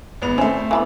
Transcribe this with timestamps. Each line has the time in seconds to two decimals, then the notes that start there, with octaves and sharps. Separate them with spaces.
0.22 G#1 B3 F7
0.38 A3 C4 C#4 E5
0.71 E3 A3 B3